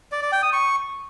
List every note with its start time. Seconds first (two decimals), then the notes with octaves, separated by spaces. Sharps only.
0.12 D5
0.22 D5
0.32 G5
0.43 D#6
0.53 C#6